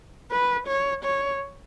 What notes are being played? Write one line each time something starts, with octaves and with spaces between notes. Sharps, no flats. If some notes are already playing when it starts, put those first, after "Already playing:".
B4
C#5
C#5